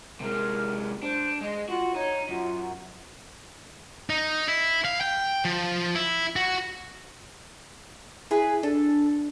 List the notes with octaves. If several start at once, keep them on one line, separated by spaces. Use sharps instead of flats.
C3 G#3 A#4
D4 C5
G#3 D#5
F4 F#4
D#4 C#5
F#2 F4
D#4
E4
F5
G5
F3
E4
F#4
E4 G#4 B4 G#5
D4 A4